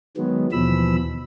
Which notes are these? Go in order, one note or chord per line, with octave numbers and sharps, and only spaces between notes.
D#3 F#3 G#3 B3
D#2 B2 E3 F3 B5 E6